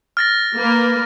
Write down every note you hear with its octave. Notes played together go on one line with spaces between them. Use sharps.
F6 A6 A#6
A#3 B4